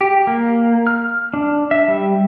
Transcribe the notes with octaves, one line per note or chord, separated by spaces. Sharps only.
G4
A#3
F6
D4
E5
G3